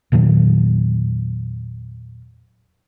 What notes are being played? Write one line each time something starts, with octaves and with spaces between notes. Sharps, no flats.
E2 A#2 D#3 F#3